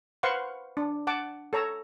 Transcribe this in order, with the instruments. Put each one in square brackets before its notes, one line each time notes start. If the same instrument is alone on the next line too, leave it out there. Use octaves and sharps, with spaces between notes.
[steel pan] B4 C5 F5 F#5 C6 C#6
D4
F#5 A5 D6
A4 C#5 A#5 E6